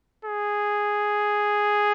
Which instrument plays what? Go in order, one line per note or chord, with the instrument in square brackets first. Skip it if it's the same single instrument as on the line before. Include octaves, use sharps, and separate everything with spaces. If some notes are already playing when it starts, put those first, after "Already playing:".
[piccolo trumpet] G#4